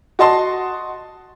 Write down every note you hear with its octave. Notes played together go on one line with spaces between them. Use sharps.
F#4 D#5 A5 C6